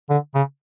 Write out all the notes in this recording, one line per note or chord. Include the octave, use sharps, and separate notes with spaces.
D3
C#3